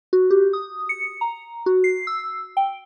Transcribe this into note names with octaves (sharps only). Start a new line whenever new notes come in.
F#4
G4
D#6
C#7
A#5
F#4
C7
E6
G5